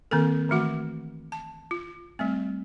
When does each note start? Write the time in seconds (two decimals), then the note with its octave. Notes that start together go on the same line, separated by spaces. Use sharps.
0.11 D#3 A#3 C4 A4 A#4
0.49 D#3 E3 A3 F#4 F#5
1.32 A5
1.71 F4
2.19 G3 A3 C4